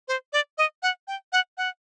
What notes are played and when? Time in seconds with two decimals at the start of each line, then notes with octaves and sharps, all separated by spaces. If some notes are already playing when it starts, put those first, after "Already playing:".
0.08 C5
0.33 D5
0.58 D#5
0.83 F#5
1.08 G5
1.33 F#5
1.58 F#5